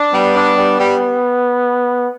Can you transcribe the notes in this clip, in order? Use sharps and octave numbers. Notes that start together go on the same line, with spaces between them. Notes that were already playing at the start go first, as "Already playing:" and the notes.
Already playing: D4
G3 B3
D4
G3
G3